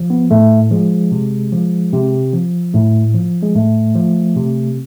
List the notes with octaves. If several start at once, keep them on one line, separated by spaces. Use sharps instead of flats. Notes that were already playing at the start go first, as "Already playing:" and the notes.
Already playing: F3
B3
A2 A3
F3 G#3
C3
F3
C3
F3
A2 A3
F3
G#3
A2 A3
F3
C3